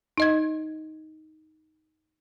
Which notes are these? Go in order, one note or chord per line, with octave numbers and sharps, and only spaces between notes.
D#4 D#5 G#6